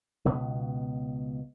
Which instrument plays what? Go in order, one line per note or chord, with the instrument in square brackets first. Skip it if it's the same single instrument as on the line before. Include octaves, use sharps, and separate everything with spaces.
[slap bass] C#2 B2 B3